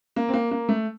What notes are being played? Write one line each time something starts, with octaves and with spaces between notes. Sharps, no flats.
A#3
C4
A#3
A#3
A3